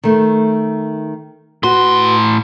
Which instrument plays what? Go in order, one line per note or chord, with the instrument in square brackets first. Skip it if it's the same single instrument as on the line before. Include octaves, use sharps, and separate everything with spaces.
[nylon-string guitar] D#3 A3
[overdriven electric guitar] A2 C6 [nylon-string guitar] F#4 B4